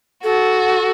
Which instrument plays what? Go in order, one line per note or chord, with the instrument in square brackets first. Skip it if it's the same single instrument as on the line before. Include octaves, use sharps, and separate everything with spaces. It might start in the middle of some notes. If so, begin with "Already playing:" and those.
[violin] F#4 [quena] A4